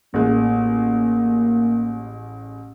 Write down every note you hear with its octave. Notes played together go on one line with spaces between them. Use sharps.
A1 G#3 A#3